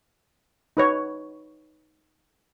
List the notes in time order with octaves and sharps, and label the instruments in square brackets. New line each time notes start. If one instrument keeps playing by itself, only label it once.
[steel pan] D#4 B4 C#5